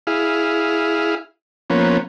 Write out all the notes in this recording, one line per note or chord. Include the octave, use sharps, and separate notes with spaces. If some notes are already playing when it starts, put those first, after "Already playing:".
E4 G#4 F5
F3 A#3 B3 C#4